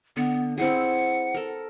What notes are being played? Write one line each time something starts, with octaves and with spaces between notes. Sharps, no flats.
D3 B3
C4 E4 G#4 F#5
A4 A#4